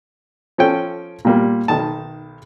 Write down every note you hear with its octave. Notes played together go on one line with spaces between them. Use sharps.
F3 C#4 A4 G5
A#2 G3 A#3
B1 D#3 A5